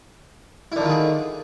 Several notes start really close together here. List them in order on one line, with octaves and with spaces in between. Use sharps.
E4 D3 D#3 F4 G#4